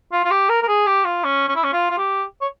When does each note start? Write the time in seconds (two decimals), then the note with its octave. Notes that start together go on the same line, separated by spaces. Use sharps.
0.12 F4
0.24 F4
0.31 G4
0.49 A#4
0.62 A#4
0.68 G#4
0.86 G4
1.05 F4
1.24 C#4
1.49 C#4
1.55 E4
1.63 C#4
1.73 F4
1.90 F4
1.98 G4
2.41 C#5